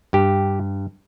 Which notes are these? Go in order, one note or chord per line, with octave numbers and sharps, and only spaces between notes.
G2 G4